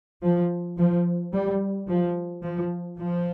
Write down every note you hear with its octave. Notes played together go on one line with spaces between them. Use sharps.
F3
F3
G3
F3
F3
F3